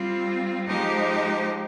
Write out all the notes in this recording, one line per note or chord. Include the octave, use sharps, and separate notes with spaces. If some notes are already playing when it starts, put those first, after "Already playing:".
Already playing: G3 C4 F4
F3 G#3 D#4 G4 C5